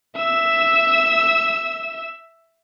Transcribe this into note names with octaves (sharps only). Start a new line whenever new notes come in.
E5 E6